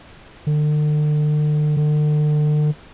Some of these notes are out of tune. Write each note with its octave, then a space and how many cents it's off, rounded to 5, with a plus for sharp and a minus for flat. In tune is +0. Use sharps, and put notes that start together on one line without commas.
D3 +40
D3 +40